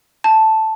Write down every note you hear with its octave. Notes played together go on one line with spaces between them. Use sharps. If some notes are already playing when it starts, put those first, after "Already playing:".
A5